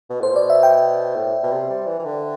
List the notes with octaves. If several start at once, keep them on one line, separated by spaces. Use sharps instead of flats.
B2
A2 C5
B2 D5
E5
G5
A2
B2
C3
G3
E3
E3
D3